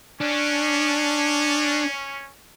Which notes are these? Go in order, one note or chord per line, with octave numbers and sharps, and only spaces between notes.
C#4 D4